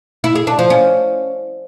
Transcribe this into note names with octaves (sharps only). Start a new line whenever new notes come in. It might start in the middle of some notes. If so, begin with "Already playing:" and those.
E4
G#4
D4
F3
C#4